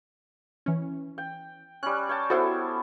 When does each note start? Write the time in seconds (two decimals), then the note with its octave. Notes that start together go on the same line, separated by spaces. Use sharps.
0.66 E3 C#4
1.18 G5
1.83 G3 C#4 F#6
2.09 C#5 G5 A5
2.30 B3 E4 F#4 A4 C5